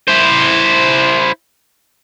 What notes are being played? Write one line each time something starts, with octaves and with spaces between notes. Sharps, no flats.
E4 C5